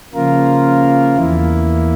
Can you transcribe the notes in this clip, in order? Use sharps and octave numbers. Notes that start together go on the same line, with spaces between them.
C#3 F3 A#3 F4 A#4
E2 E3 A#3 E4